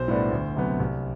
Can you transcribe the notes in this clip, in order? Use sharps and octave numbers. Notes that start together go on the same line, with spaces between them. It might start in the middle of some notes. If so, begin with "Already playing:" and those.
Already playing: B1 C5
A2 G3 B3 D4
D2
C3 F#3 B3
C2